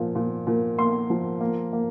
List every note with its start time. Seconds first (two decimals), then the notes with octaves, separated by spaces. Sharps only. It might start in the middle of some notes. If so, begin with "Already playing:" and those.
Already playing: A#2 F3
0.15 A#2
0.47 A#2
0.78 A#3 C6
1.10 F3
1.41 A#3
1.73 A#3